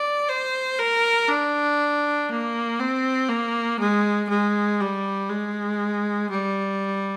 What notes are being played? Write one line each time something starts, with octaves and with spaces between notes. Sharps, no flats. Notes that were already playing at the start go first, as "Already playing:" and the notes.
Already playing: D5
C5
A#4
D4
A#3
C4
A#3
G#3
G#3
G3
G#3
G3